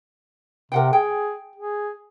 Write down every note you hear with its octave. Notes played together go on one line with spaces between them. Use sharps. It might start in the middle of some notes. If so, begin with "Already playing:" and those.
C3 A#4 F#5 G5
G#4 G5
G#4